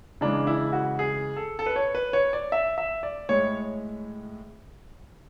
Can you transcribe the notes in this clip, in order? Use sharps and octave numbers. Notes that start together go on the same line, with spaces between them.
C#3 E3 G#3 D4
E4
F#4
G#4
A4
A4
B4
C#5
B4
C#5
D5
E5
E5
D5
A2 G#3 C#5